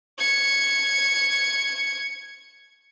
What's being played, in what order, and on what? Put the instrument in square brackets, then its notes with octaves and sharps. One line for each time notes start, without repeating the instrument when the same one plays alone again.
[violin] G#6 C#7